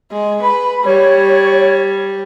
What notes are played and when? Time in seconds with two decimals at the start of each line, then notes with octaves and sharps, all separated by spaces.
0.12 G#3
0.42 B4 B5
0.84 G3 C#5